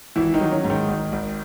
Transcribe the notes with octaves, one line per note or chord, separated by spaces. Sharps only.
G#1 E3 E4
D#3 D#4
F#3
C#4
G#2
D#3 D#4
G#1
G#1